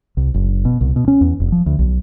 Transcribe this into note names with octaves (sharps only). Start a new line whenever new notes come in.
C2
F#1
B2
C2
B2
C#4
E2
F1
F3
D2
B1